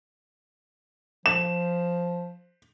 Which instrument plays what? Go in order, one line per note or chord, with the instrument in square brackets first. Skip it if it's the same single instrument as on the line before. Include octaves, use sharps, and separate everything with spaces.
[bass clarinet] F3 [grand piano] E7